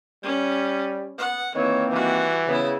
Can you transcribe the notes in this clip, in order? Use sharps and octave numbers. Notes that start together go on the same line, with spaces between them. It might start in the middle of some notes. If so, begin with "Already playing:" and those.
G3 C#4
B3 F#5
D#3 E3 A#3 C4 C#5
E3 G3 F#4
C#3 B3 E4